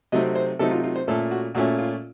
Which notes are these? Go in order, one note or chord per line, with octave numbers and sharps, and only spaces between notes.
C3 F#3 A3 C4 D#4 D#5
C5
C3 F#3 A3 C4 D#4 A4
F4
F4
C5
A#2 A3 C#4 A4
F#4
A#2 A3 C#4 F#4
F4